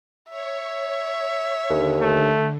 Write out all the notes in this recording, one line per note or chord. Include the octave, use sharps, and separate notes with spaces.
C#5 E5
D#2 D3
A3